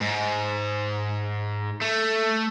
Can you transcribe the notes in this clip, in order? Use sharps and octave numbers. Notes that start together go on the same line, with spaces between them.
G#2
A3